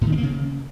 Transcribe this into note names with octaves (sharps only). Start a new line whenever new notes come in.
A2
D#3
C4
A#3
C#3